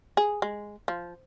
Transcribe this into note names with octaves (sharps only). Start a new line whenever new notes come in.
G#4
G#3
F3